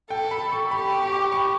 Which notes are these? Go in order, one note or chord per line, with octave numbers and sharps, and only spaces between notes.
A4 G5
B5
C#6
G4 B5
C#6
C#6
D6
C#6